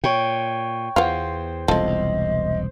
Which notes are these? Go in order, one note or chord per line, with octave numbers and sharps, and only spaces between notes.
A#2 C#5 G5
E2 B3 F4 C5 F5
E1 C2 F4 A4 C5 D#5